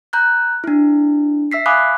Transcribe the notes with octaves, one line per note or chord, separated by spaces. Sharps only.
A#5 F#6 G6
D4 E4
E5 E6 B6 C7
F5 G#5 B5 D6 D#6 F#6